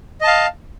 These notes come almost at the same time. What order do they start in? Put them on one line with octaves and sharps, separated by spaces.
D#5 A5 F5